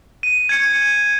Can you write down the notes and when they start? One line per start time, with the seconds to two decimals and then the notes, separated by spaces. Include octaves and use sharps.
0.23 D#7
0.49 G#6 C#7